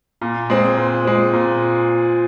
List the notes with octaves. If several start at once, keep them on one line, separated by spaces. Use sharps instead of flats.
A#2
G#3 C4
A#2
G#3 C4
A#2